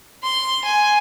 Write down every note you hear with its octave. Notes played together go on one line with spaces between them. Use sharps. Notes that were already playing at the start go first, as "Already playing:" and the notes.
C6
G#5